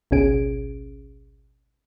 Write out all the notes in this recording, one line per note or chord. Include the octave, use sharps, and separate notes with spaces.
G#1 C#2 B2 C#4 G#4 D7